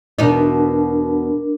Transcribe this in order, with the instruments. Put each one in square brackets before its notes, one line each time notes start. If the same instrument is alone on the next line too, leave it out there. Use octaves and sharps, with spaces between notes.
[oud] E2 B2 D#4 [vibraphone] D4 A#4